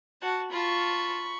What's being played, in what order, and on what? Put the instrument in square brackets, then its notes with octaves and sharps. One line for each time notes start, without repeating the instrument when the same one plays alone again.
[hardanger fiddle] F#4 [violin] A5
[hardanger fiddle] F4 A5 [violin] B5 C#6